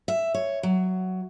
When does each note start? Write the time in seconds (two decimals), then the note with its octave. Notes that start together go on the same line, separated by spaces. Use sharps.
0.08 E5
0.34 C#5
0.63 F#3